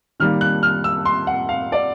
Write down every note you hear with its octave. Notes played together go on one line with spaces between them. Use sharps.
D#3 G3 A#3 F6
F#6
F6
E6
C6
F#5
F5
D5